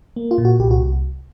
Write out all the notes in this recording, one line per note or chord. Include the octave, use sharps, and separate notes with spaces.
A#3
F4
A#2
F#4
C2 G4
F#4